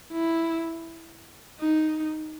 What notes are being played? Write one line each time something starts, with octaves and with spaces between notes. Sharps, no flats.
E4
D#4